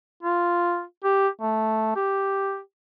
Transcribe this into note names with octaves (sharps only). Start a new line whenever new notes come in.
F4
G4
A3
G4